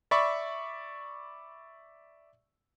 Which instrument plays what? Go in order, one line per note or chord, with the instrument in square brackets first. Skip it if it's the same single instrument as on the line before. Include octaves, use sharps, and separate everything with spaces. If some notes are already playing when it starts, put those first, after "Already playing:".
[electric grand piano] D5 E5 B5 C#6